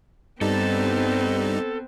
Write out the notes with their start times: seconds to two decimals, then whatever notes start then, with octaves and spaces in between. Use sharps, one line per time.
0.41 G2 G3 B3 C4 D#4 A4